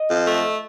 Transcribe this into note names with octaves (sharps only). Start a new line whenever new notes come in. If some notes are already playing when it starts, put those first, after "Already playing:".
Already playing: D#5
F2
A3